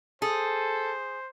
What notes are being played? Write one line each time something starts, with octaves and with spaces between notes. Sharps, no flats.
G#4 A4 C5